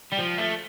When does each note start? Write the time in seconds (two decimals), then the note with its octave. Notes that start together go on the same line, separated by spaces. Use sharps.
0.12 G3
0.19 F3
0.38 A3